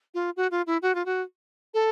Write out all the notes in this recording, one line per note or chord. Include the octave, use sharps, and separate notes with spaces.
F4
F#4
F4
E4
F#4
F4
F#4
A4